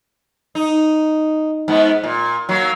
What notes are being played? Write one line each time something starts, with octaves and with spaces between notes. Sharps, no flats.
D#4
G#2 B3
A#2
F#3 A#3